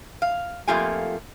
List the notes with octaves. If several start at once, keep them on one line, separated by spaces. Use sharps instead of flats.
F5
F2 A3 A#3 F4 G4 G#5